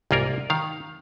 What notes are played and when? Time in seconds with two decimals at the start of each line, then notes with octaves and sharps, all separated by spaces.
0.11 C2 G#2 A#3 F4 A#4
0.50 D#3 F5